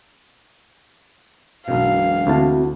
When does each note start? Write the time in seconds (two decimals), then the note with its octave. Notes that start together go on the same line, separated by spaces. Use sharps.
1.68 E1 B1 F#2 B2 F5
2.27 D2 C4 E4 F#4 A5